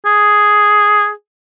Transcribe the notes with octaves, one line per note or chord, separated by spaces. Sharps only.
G#4